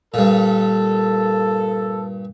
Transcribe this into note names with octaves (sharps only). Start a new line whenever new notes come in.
G2 A#2 A4